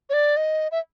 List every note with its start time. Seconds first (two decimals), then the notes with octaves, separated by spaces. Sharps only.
0.10 C#5
0.13 D5
0.37 D#5
0.72 E5